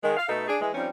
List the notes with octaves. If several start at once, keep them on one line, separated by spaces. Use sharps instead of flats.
D#3 G#3
F5
B2 A3 D#4 A4
D4 G#4
E3 G#3
F3 G3 C4 C#4 D#4